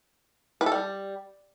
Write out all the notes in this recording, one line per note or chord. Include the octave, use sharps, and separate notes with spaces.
B4
A4
G3